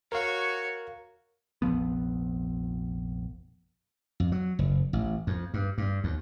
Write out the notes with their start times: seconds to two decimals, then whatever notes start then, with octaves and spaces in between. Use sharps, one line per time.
0.12 F#4 A#4 C#5 F5
1.62 F1 A#1 F3 B3
4.20 F2
4.32 F#3
4.59 F#1
4.93 A1
5.27 F2
5.54 G2
5.78 G2
6.04 D#2